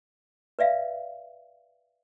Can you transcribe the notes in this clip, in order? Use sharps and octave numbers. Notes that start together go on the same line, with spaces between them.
B4 D5 E5 F5